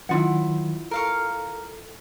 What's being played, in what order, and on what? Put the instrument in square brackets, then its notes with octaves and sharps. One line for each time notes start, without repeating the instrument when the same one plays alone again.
[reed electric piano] D#3 F#3 [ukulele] E4 F4 F#5
[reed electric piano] A4 [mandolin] A#4 F5 C#6